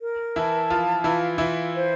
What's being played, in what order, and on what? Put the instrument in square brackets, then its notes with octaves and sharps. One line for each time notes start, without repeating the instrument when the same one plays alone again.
[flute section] A#4
[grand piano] E3 E4 [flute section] A5
[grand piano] F3 F4 [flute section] F5
[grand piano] E3 E4 [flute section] F4
[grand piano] E3 E4 [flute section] F5
[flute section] C5